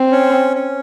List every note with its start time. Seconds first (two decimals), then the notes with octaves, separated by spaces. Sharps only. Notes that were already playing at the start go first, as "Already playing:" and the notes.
Already playing: C4
0.11 C#4
0.55 C#4